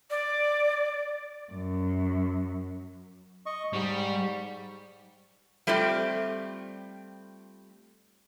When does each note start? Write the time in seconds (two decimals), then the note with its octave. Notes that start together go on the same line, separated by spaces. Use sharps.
0.10 D5
1.51 F#2
3.46 D#5 C#6
3.73 G#2 G3 C#6
5.67 G3 A3 C4 F4 G4